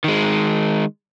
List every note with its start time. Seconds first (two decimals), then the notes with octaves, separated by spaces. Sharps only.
0.04 D#3 G#3